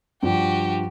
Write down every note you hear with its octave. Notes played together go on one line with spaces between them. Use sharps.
G2 F3 F#4 G4